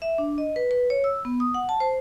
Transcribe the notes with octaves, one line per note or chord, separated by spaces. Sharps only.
E5
D4
D#5
B4
B4
C#5
E6
B3
D#6
F#5
A5
C5